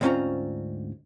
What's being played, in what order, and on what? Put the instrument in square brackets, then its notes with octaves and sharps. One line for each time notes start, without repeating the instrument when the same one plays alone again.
[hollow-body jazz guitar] D2 G#2 C4 C#4 F4 A#5